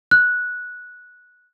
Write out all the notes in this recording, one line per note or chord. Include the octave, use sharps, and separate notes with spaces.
F#6